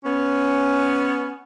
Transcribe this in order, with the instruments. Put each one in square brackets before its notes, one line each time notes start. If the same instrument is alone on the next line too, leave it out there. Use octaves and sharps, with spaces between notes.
[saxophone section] B3 C#4